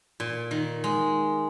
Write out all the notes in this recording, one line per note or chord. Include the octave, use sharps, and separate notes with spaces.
A#2
D#3
G#3